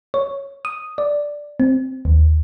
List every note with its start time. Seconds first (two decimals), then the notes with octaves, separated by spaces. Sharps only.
0.14 C#5
0.65 D#6
0.98 D5
1.60 C4
2.05 D#2